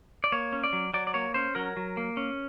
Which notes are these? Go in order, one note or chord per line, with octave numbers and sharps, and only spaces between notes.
D5
A#3 C#5
C#4
D5
F#3
F#3 D5
D5
A#3 C#5
C#4 C5
F#3 A#4
F#3
A#3
C#4